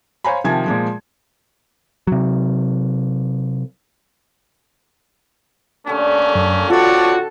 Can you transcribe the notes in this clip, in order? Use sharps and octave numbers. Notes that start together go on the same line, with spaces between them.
C5 C#5 F5 G#5 A#5 B5
C3 D#3 F3 G#5 A5 G#6
A#2 F3 G#3
C3 F#3
D3 A3 A#3 C#4 G4
F#2
C4 F4 F#4 A4 C#5 D5 A5